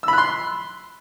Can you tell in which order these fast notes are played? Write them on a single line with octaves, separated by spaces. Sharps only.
E6 B5 F#6 C6